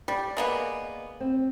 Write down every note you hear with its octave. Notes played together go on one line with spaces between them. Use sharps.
G3 D5
G#3 A#3 B3
C4